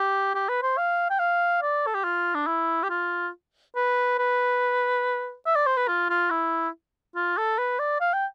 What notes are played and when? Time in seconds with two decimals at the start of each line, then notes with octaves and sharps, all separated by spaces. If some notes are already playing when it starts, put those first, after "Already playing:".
Already playing: G4
0.35 G4
0.49 B4
0.63 C5
0.78 F5
1.10 G5
1.19 F5
1.62 D5
1.86 A4
1.95 G4
2.04 F4
2.35 D4
2.47 E4
2.83 G4
2.90 F4
3.76 B4
4.18 B4
5.46 E5
5.56 D5
5.66 C5
5.77 B4
5.88 F4
6.10 F4
6.30 E4
7.16 F4
7.38 A4
7.58 B4
7.79 D5
8.01 F5
8.13 G5